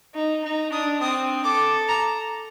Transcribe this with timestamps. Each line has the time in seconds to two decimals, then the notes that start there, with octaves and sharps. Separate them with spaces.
0.15 D#4
0.44 D#4
0.72 D4 D#6
1.01 C4 D#6
1.44 A4 D6
1.88 A#5